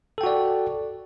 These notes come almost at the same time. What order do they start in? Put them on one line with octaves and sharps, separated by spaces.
A4 G5 F#4 D5